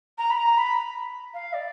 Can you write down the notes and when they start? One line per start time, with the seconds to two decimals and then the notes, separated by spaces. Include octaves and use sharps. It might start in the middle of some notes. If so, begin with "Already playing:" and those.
0.18 A#5
0.30 B5
0.37 A#5
0.57 B5
1.34 F5
1.53 D5